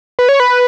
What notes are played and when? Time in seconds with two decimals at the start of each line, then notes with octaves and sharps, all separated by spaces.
0.19 B4
0.29 C#5
0.40 B4